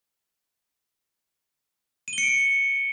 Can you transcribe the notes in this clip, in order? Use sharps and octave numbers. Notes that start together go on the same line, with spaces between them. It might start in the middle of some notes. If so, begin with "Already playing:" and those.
D#7
G7
C#7
D7
C#7